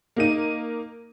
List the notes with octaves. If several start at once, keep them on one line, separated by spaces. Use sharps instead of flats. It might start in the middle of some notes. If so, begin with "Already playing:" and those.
A#3 D#4 D#7